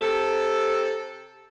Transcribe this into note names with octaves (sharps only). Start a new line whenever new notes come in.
C3 A4